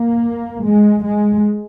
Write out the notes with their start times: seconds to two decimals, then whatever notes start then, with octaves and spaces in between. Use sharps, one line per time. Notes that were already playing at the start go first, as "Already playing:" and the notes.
Already playing: A#3
0.65 G#3
1.04 G#3